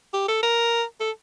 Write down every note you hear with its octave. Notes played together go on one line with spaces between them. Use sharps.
G4
A4
A#4
A4